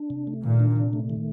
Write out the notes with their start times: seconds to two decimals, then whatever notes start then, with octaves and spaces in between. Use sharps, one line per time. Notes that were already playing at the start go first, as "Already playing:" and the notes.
Already playing: D4
0.10 C3
0.27 A3
0.43 A#2 D#3
0.60 D4
0.76 C3
0.93 A3
1.10 D#3